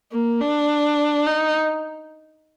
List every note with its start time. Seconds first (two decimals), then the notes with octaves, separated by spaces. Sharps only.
0.12 A#3
0.40 D4
1.26 D#4